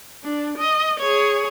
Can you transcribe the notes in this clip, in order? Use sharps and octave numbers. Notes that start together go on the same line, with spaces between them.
D4
D#5
G#4 C#5